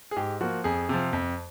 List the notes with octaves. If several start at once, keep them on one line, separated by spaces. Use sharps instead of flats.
G#4
G#2 G4
F3 A#3 F#4
F2 G#4
C3 F3
F2